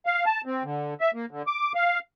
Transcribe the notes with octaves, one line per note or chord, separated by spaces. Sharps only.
F5
A5
C4
D3
E5
A#3
D3
D6
F5